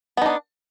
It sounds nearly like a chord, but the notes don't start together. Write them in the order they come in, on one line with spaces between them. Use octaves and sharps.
B3 D#4 D4